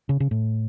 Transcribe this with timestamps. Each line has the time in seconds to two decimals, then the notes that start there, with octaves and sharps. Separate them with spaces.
0.09 C#3
0.20 C#3
0.31 A2